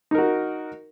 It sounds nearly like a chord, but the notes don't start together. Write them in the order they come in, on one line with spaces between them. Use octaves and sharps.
D#4 A#4 F#4